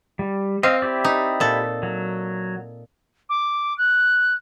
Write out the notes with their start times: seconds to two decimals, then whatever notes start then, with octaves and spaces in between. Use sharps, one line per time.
0.19 G3
0.63 C4 D#5 F5
0.82 E4 G4 D5
1.05 D#4
1.40 A#2 A4
1.83 F#3
3.29 D6
3.78 F#6